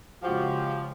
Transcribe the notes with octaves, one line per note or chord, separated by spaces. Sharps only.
C#3 F3 G#3 F#4 G4